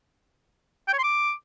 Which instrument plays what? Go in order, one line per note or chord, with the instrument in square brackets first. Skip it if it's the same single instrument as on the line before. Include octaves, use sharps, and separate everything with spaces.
[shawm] G5
C#5
C6
D6